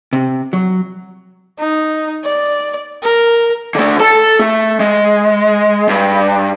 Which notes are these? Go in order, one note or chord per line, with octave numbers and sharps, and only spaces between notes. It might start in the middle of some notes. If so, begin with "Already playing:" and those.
C3
F#3
D#4
D5
A#4
D3 A3
A4 A5
A3
G#3
G2